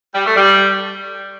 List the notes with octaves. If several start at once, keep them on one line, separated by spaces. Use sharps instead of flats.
G3
A3
G3